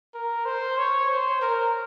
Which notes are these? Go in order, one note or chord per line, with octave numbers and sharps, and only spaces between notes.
A#4
C5
C#5
C5
A#4